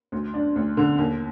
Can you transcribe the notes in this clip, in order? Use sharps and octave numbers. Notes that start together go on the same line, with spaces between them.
D2
D4
D2
D3
D#2